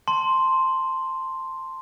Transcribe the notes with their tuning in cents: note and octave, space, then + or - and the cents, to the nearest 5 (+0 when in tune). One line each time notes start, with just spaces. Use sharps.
A5 +20 C6 +0